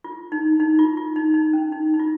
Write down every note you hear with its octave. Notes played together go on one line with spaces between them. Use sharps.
F4
D#4
D#4
F4
F4
D#4
D#4
C#4
D#4
D#4
F4